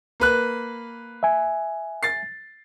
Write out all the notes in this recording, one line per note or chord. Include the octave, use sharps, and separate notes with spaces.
A#3 B4 F#6
E5 G#5
A6 C7